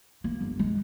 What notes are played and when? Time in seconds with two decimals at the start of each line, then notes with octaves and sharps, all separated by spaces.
0.24 A#3
0.41 G1
0.59 G#3